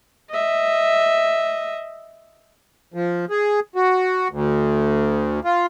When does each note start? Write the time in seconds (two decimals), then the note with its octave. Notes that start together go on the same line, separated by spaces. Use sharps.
0.31 D#5 E5
2.94 F3
3.30 G#4
3.76 F#4
4.31 D2
5.45 F4